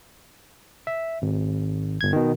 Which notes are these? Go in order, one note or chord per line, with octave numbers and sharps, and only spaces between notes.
E5
G#1
G1 G#6
B2 D#3